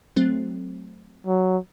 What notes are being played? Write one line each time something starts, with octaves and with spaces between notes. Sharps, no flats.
F#3 A3 C4
F#3